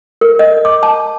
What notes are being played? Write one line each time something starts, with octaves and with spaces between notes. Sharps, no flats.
A#4
D#5
D6
A5